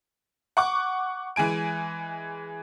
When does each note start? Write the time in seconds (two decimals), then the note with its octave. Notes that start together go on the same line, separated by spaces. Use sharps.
0.57 F#5 C#6 D6
1.36 E3 G#3 G#5 D7